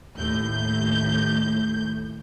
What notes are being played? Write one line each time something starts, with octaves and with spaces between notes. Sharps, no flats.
D#2 A2 G6